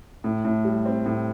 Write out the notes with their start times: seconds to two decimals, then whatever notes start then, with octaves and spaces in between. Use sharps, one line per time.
0.24 A2
0.45 A2
0.65 G3
0.86 C4
1.06 A2